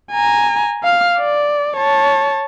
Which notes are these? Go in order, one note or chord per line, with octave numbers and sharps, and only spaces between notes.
G#5 A#5
F5 F6
D5
C#5 A5